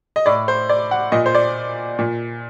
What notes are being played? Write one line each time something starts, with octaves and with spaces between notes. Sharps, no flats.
D#5
A2 D5
C5
D5
F#5
A#2 D#5
C5
D5
A#2